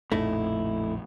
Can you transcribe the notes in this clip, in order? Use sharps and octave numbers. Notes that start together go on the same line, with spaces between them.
A#1 F2 A2 A3 D#4 E4